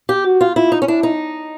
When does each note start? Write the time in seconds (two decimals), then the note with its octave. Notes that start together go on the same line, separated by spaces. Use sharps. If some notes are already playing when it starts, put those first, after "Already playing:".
0.09 G4
0.25 F#4
0.41 F4
0.56 E4 F4
0.72 D#4
0.82 C#4
0.88 D4 E4
1.03 D#4